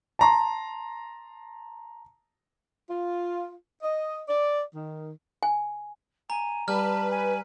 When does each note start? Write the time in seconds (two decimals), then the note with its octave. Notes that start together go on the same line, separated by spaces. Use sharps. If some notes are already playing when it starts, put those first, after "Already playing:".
0.19 A5 A#5 C6
2.90 F4
3.82 D#5
4.29 D5
4.75 D#3
5.43 G#5
6.30 G#5 A#5
6.68 G3 B4 A5 F6
7.11 G#5